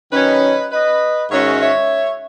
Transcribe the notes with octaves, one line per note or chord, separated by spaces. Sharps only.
D#3 F#3 C#4 B4 D#5
B4 D#5
G#2 D#3 G#3 C#4 F#4 C#5 E5
C#5 E5